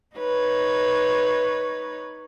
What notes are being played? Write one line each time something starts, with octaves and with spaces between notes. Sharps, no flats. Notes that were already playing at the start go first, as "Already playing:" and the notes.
D#4 B4 C#5